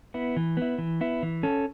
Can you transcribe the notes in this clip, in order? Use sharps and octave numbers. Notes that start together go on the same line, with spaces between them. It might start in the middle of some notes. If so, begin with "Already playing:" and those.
B3 E4
E3
B3 E4
E3
B3 E4
E3
C#4 A4